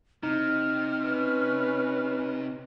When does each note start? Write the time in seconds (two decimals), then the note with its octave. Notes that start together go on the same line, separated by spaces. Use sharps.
0.23 C3 D#4 F6
1.07 C#4 B4